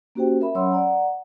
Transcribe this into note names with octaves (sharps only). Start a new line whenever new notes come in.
A#3 C#4 F#4 G4 C5 G5
A#4 E5 B5
F#3 C#4 C#5 F#5 C6 E6
D5 F#5 A#5